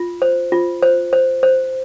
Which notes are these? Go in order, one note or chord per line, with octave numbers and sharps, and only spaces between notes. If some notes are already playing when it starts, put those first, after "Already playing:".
Already playing: F4
C5
F4
C5
C5
C5